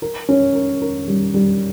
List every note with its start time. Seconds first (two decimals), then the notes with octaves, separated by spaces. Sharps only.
0.02 A#4
0.29 C#4
0.55 A#4
0.82 A#4
1.08 G3
1.34 G3